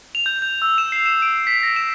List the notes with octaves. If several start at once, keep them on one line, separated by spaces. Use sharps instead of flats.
F7
G6
G6
E6
E7
C7
E7
D7
B6
A#6
E7